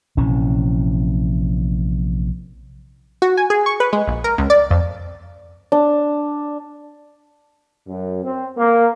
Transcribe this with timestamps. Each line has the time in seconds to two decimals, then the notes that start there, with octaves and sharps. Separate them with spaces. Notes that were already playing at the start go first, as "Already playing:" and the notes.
0.17 A#1 C3 E3 C#4
3.22 F#4
3.37 G#5
3.50 G#4
3.66 C#6
3.80 B4
3.93 G#3
4.07 A#1
4.24 A#4
4.38 C#2
4.50 D5
4.70 F2
5.72 D4
7.87 F#2
8.24 C4
8.57 A#3